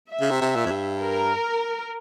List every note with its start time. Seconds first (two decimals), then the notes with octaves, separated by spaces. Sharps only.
0.11 E5
0.21 C#3
0.31 C3
0.41 C3
0.56 A#2
0.66 F2
0.71 G2
1.01 A#4